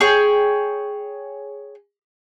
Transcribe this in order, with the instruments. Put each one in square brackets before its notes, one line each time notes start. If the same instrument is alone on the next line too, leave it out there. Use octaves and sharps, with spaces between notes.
[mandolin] G#4 C#5 G5